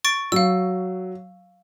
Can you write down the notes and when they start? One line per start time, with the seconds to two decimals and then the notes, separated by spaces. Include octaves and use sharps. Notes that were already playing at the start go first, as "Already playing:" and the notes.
0.05 C#6 A6 D7
0.32 F#3 F5 E6